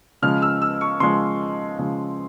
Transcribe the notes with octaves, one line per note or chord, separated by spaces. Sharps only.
C#3 F3 G#3 F6
E6
E6
C#6
C#3 F3 G#3 C6
C#3 F3 G#3